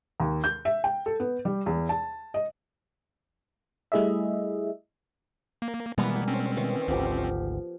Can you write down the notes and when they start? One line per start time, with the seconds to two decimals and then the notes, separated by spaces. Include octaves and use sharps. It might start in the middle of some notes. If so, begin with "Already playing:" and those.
0.20 D#2
0.44 G6
0.65 E5
0.84 G5
1.06 A4
1.20 B3
1.45 G3
1.66 E2
1.89 A5
2.34 D#5
3.92 G3 A3 E4 G#4 D#5 E5
5.62 A#3
5.98 B2 E3 G3 G#3 A#3 B3 A#5
6.28 C4 C#4
6.57 D#3 E3 B3
6.88 G#1 D2 F3 G4